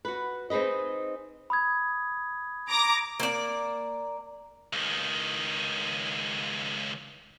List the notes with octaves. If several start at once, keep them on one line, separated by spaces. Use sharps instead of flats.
F#4 B4
C4 D#4 G#4 B4 D#5
B5 D#6 G#6
A#5 D6 A#6
A#3 D5
C#2 D#3